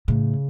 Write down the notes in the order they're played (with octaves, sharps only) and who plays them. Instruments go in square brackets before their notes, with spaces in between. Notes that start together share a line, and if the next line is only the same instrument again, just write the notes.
[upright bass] A2 [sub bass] C#3